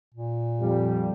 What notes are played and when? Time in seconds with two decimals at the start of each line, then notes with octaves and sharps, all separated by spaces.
0.14 A#2
0.61 F2 G3